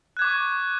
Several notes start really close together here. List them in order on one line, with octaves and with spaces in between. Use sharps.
F#6 G#6 D6 C#6